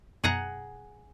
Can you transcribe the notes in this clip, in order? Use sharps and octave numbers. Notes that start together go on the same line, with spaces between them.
F#2 B2 G#4 F#5 A#5